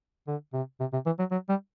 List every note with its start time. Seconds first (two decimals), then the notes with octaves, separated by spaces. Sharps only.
0.28 D3
0.54 C3
0.80 C3
0.93 C3
1.06 E3
1.19 F#3
1.31 F#3
1.49 G3